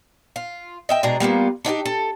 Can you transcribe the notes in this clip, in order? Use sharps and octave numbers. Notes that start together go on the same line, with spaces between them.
F4
D#5 E5 G5
B2 G#3 D4 A#5
G3 A#3 B3 F4
D4 D#4 F#4 G4
A4